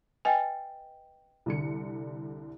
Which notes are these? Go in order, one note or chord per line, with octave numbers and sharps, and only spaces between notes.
B4 D#5 G5 G#5
C2 D3 C#7